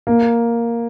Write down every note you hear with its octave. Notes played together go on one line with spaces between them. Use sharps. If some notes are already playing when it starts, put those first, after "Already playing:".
A#3